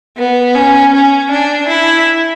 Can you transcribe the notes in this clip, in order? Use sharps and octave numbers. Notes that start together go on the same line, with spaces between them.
B3
C#4
C#4
D4
E4